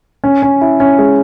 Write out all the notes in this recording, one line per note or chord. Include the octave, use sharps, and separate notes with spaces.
C#4
C#4
E4
C#4
G#3